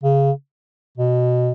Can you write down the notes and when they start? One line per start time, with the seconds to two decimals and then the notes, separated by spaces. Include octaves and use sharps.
0.03 C#3
0.98 B2